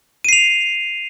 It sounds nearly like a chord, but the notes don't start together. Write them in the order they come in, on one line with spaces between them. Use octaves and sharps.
D#7 C7 F7